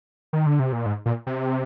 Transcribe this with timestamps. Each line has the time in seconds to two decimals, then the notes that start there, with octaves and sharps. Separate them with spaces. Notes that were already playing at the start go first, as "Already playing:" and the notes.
0.33 D#3
0.46 D3
0.59 C3
0.72 A#2
0.86 G#2
1.06 A#2
1.27 C3